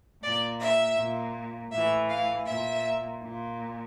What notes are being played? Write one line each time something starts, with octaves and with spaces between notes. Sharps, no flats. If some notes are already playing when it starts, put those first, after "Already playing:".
A#2 D5
E5
A#2
A2 E3 E5
F5
A#2 E5
A#2